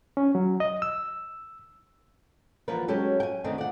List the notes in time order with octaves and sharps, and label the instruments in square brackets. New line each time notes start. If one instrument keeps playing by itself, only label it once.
[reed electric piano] C#4
F#3
D#5
E6
[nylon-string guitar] D3 E3 F3 A#3 A#4 B4
F#3 G#3 C#4 G4 A4
G5 G#5
D3 D#3 A3 C4 D4 D#4
D5 F#5